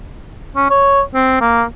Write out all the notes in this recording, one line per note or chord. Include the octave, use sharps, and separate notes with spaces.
C#4
C#5
C4
A#3